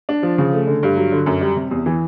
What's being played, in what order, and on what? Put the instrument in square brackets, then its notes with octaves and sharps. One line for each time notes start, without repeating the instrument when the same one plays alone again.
[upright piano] D4
F3
C#3
A3
D3
G2
F#3
D3
F#2
G3
C3
E2
E3